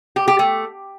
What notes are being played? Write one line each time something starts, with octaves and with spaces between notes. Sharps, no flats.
G4
G4
A3